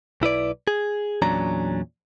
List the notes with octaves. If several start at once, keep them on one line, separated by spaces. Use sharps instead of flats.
B1 E4 B4 D5
G#4
E2 A#2 F#3 C#4 D4 A#5